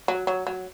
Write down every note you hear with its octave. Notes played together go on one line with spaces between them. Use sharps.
F#3
F#3
F#3